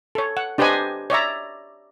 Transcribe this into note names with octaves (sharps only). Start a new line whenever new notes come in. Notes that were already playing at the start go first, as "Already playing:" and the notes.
A4 C#5
F#5
D4 G4 B4 C5 D#5 G#5
C#5 D5 E5 A#5